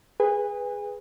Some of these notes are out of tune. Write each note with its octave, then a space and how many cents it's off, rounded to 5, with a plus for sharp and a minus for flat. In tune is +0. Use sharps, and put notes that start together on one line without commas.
G#4 +0 B4 +0 G#5 -35